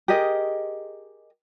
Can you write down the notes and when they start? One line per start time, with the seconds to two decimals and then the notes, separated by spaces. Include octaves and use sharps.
0.08 G4 G#4 A#4 D#5